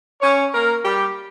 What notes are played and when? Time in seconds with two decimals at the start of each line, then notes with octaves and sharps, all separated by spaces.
0.21 C#4 C#5
0.53 A#3 A#4
0.83 G3 G4